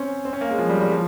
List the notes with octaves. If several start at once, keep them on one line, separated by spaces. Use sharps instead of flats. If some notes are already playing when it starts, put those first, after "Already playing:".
Already playing: C4 C#4
C4
C#4
A#3
G#3
F3
G3
G3
F3